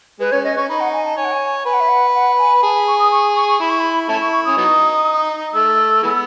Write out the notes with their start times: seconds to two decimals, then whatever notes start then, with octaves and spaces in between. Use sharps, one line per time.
0.20 G#3 B4
0.32 C#4 C#5
0.44 C#4 D#5
0.57 C#4 C#6
0.68 D#4 B5
0.80 F#5
0.93 G#5
1.05 A5
1.17 C#5 G#5
1.25 F#5
1.32 G#5
1.65 B4 G#5
1.73 F#5
1.80 E5
1.88 F#5
2.14 F#5
2.38 G#5
2.62 G#4 A5
2.75 B5
2.87 C#6
2.99 D#6
3.11 C#6
3.35 C#6
3.48 C#6
3.60 E4 B5
3.70 C#6
3.79 B5
4.09 A3 C#4 E4 A5
4.21 C#6
4.32 C#6
4.45 C#4 D#6
4.57 F#3 B3 D#4
5.54 A3 E6
6.03 E3 G#3 B3